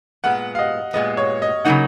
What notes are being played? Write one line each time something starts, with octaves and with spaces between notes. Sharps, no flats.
A#2 G#3 B3 F#5
F5
D#5
A#2 G#3 B3 D#5
C#5
D#5
C#3 F#3 A#3 D#4 F#5